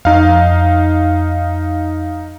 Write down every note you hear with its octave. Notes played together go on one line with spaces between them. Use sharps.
F2 D#4 F5